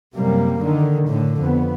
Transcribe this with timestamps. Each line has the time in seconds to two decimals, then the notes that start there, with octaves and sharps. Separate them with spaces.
0.15 F#2 C3 G3 A#3
0.61 D3 D#3
1.08 A2 D3
1.41 F2 B3